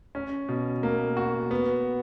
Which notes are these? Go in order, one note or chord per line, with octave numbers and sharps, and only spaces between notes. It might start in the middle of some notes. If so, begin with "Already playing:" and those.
C#4
B2
A#3
F#4
B3